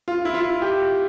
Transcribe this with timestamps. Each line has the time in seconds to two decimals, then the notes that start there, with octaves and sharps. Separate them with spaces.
0.08 F4
0.25 E4
0.34 F4
0.62 G4